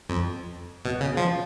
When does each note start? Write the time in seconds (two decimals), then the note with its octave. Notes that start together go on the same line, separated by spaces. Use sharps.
0.09 F2
0.85 B2
1.00 C#3
1.17 F3